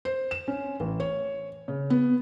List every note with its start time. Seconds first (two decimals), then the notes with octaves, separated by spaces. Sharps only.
0.05 C5
0.31 E7
0.48 C#4
0.80 A1
1.00 C#5
1.68 C#3
1.90 B3